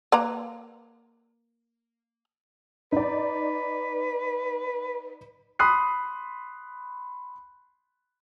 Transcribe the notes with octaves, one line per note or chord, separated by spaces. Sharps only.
A#3 B4 A#5
D#4 B4 D5
B5 C6 D#6 F#6 C7